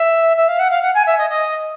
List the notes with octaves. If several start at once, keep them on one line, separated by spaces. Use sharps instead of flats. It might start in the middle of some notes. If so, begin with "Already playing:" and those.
Already playing: E5
E5
F5
F#5
F5
F#5
G#5
E5
D#5
D#5